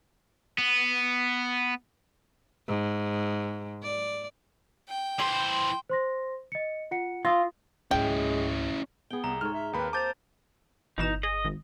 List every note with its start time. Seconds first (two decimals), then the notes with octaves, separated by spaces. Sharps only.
0.58 B3
2.68 G#2
3.83 D5
4.89 G5
5.19 E3 C5 C6
5.90 C5 C6 A#6
6.52 D#5 C#7
6.91 F4 F#5 C#7
7.25 F4 D#6 E6 A#6
7.91 C#2 G#2 G#3 C#4 E4 G5
9.11 B3 G#4 G5 G7
9.24 C2 A#5
9.41 G#2 A4 C#5 F6
9.53 E5
9.73 D#2 A#3 C4 B4 B5
9.93 C5 A5 D6 G6 A6 F7
10.98 G1 B2 E3 D#4 E7
11.23 G#4 D#5
11.45 G#1